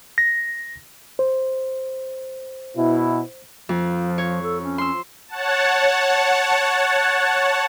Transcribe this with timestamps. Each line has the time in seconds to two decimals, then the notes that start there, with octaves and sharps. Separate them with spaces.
0.18 A#6
1.19 C5
2.77 B2 E4
3.69 F2 F3
4.18 C#5
4.43 A4
4.62 C#4
4.78 C6 E6
5.28 C#5 F#5 A5